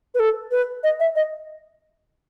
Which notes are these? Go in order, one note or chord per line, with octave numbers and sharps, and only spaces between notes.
B4
A4
B4
D#5
E5
D#5